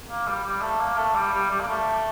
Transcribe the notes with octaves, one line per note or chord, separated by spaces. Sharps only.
A#3
G3
G3
A3
A#3
A3
G3
G3
G3
A#3
A3